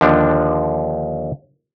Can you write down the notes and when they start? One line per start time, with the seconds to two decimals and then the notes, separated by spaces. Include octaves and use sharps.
0.01 D#2 D3 F3 D4